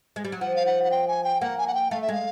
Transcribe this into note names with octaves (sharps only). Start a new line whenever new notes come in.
G#3
G3
F#3
F3 F#5
F5
F#5
F#5
G5
G#5
G5
A#3 F#5
G#5
F#5
G5
A3 F5
E5
G#3 F5